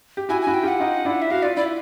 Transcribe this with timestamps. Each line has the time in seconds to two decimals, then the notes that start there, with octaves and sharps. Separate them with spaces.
0.17 G4
0.29 E4 F#4 G#5
0.42 G#5
0.47 E4 F#4
0.54 G5
0.63 F4 G4 F#5
0.80 D#4 F4
1.05 D4 E4
1.22 E5
1.31 F#4 F5
1.43 F4 D5
1.56 E4 D5